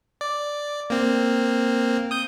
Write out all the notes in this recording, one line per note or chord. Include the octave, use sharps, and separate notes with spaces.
D5
A#3 C4
D#6 G6